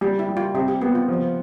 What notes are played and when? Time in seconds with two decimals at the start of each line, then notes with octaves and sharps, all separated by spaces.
0.01 G3 G4
0.19 E4
0.29 G3
0.37 F4
0.54 C3 G4
0.68 G4
0.81 B3 G4
0.95 F4
1.08 F3